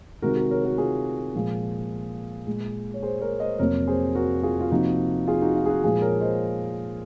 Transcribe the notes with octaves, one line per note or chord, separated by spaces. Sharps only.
C3 D#3 G#3 F#4 A#4
F#4 A#4
A#4 C#5
F#4 A#4
F4 G#4
A#2 F3 G#3
A#2 G#3
C#5
G#4 C5
A#4 C#5
C5 D#5
F2 C3 F#3 A#3 A#4 C#5
G#4 C5
F#4 A#4
F4 G#4
F4
C3 F3 A#3 D#4 F#4
F4 G#4
D#4 F#4
F4
G#4
D#4 F#4
A#2 F3 G#3 F4 G#4
A#4 C#5
C5 D#5